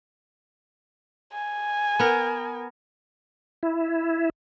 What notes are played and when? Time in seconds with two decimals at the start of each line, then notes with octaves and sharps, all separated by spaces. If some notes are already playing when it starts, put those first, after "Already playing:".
1.33 G#5
1.99 B3 A#4
3.63 E4